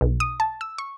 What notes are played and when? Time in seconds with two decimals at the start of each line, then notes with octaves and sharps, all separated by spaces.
0.01 B1
0.20 D#6
0.40 A5
0.61 E6
0.78 C#6